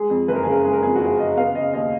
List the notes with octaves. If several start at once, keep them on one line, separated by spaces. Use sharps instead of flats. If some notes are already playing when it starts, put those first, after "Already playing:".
Already playing: G#3 G#4
F2
F#1 B4
A#4
G#4
C#3 A#4
G#3 G#4
A#4
F2 G#4
F#4
F#1 G#4
C#3 D#5
B3 F5
C#3 D#5
D#2 D#5